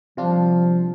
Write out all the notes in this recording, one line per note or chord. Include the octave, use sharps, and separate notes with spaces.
C3 F3 G3 D4 F4